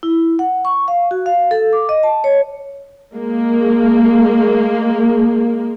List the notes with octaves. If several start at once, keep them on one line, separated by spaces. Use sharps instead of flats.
E4
F#5
C#6
F5
F#4
F5
A4
D6
D#5
A5
C#5
G#3 A#3